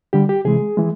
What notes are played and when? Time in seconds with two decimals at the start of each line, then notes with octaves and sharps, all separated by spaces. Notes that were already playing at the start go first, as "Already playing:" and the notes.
0.13 D3 G3 G4
0.29 G4
0.45 C3 E3 G#3 G#4
0.77 E3 G#3